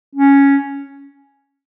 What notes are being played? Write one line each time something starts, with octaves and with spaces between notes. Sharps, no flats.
C#4